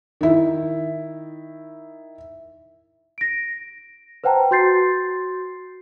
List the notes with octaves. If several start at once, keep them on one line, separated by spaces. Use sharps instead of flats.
D#3 E4
A#6 D7
B4 C5 F#5 G5 A5 A#5
F#4 C6 G6 A6 C7